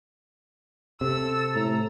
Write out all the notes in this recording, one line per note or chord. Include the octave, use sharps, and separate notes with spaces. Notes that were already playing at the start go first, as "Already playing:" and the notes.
C3 A4 E6
A2 A#5